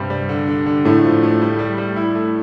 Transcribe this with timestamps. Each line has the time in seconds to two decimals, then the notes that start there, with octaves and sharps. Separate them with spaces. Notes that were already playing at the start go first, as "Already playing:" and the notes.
Already playing: G2 C3 G3
0.10 G3
0.29 D3
0.48 D3
0.66 D3
0.85 A2 A3
1.03 F3
1.23 A3
1.42 G3
1.59 G3
1.78 G3
1.96 E4
2.15 A3